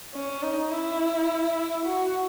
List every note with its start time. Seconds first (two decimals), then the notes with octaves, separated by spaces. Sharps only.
0.14 C#4
0.42 D#4
0.71 E4
1.86 F#4